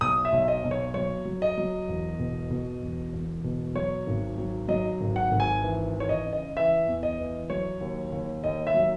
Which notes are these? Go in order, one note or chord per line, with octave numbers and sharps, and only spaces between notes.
B1 D#6
E5
B1
D#5
B1
C#5
F#3 C#5
F#3
D#5
F#3
E1
B2
B2
E1
E1
B2
F#3 C#5
G#1
F#3
F#3 D#5
G#1
F#5
G#1
G#5
E3
E3
C#5
D#5
C#3
D#5
E3 E5
E2
D#5
E3
F#3 C#5
D#2
D#2
D#2 D#5
E5
F#3